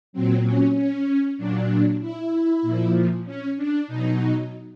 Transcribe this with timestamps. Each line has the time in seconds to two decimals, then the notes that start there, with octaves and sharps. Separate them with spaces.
0.13 A#2 F#3 C4
0.44 C#4
0.75 C#4
1.37 A#2 F#3 D4
2.01 E4
2.62 A#2 F3
3.26 C#4
3.57 D4
3.87 B2 F#3 D#4